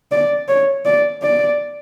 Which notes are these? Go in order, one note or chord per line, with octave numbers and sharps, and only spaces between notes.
D5
C#5
D5
D5